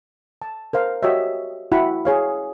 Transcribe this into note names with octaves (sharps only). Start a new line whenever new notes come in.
A5
A#4 C5 F5
F#4 G4 C#5 D#5 E5
E4 F#4 F#5 G5 B5
G#4 C#5 F5